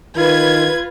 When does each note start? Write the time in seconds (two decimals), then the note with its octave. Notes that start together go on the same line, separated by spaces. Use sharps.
0.16 D#3 F4 B4 G#6